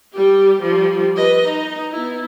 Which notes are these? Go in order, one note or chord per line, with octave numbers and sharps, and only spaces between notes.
G3 G4
F3 G3
B4 D#5
D#4
B3 E4